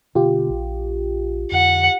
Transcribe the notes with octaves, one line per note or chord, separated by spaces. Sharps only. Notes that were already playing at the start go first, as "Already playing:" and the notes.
B2 D3 A#3 F4 G4
A#1
F2 D3 F#5